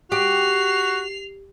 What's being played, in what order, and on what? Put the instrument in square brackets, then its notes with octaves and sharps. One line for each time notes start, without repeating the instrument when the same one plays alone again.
[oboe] F#4 [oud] G4 [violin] C7 F7